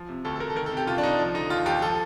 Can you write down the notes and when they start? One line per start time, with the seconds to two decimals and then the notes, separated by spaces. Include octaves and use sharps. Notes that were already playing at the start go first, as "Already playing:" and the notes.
Already playing: F3
0.09 C3
0.25 D2 A4
0.36 A4
0.40 D2 A#4
0.50 A4
0.56 D#3 A#4
0.66 A4
0.72 C3
0.77 G4
0.87 C2 F4
0.98 D4
1.03 C2 D#4
1.19 F3
1.34 D3 D#4
1.50 D#2 F4
1.66 D#2 G4
1.82 F3 A4